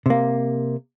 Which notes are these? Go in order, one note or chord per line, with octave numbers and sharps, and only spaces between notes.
C3 A#3